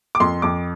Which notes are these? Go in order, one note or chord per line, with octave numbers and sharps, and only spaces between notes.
D6
F2 C6
F2 D6